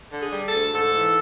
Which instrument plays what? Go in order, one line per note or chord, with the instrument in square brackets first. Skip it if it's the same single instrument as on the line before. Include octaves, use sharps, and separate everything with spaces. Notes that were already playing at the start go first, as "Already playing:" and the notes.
[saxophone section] D3
G#4
G3
A4
D2
G#2 A4
E3